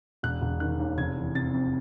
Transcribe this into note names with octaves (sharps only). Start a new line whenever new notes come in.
E1 F#6
E1
D#3 F#6
D#2
F1 G#6
E3
C3 A6
F2